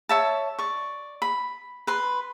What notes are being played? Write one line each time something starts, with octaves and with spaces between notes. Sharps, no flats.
C#5 E5 A5
D5 C#6
B5
B4 C6